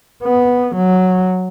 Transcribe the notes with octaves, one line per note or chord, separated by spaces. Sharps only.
B3
F#3